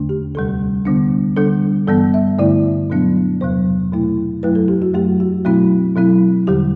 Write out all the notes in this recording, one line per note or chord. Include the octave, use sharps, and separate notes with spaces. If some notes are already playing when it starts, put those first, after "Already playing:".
Already playing: E2 D3 A3 D4
G4
D2 C3 G3 A4
D3 G3 B3 D4
D3 G3 D4 A4
G2 E3 G3 B3 A4
E5
G2 D3 A3 E4 D5
B2 F#3 B3 D4
E2 C3 F#3 C5
B2 A3 E4
F#2 F#3 A3 E4 B4
A4
G4
F#4
F#2 F#3 A3 G4
F#4
B2 F#3 A3 C4 E4
B2 F#3 C4 E4
E2 D3 G3 G4